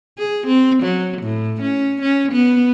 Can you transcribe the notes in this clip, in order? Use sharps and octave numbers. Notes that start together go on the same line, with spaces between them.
G#4
C4
F#3
A2
C#4
C#4
B3